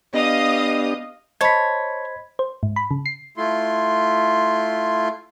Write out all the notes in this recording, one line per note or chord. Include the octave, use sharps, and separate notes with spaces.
B3 D4 G4 D#5 F5 D#6
C5 C#5 D#5 A5 B5 G#6 B6
C5
G#2
B5
C#3
C7
A3 E4 F4 C6